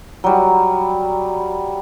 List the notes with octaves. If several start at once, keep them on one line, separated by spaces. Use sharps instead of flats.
F#3 G3